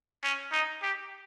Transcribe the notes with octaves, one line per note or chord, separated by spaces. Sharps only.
C#4
D#4
G4